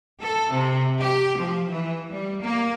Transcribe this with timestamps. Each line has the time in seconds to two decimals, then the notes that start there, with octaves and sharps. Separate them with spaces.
0.21 A4
0.51 C3
1.00 G4
1.37 F3
1.69 E3
2.10 G3
2.42 A#3